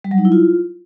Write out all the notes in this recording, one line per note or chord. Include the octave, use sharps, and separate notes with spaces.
G3
F#3
D#4
E4
F4